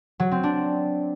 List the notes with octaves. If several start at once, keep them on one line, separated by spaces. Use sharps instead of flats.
F#3
C4
D4